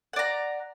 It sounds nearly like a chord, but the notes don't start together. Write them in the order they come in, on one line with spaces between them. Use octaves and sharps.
F#5 D5 A#5